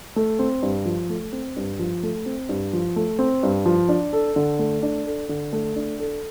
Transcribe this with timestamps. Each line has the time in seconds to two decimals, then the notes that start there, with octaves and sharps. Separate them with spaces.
0.16 A3
0.39 C4
0.62 G2
0.85 F3
1.10 A3
1.32 C4
1.56 G2
1.79 F3
2.03 A3
2.26 C4
2.49 G2
2.73 F3
2.96 A3
3.19 C4
3.43 G2
3.65 F3
3.89 D4
4.13 A4
4.36 D3
4.59 A3
4.83 D4
5.06 A4
5.29 D3
5.53 A3
5.76 D4
6.00 A4